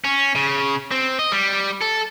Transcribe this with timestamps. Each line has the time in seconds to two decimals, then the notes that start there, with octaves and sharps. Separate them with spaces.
0.04 C#4
0.35 C#3
0.91 C4
1.19 D#5
1.32 G3
1.81 A4